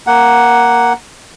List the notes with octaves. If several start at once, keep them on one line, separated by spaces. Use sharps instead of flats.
A#3 F#5